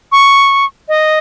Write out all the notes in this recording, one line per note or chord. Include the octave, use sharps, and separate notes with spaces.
C#6
D#5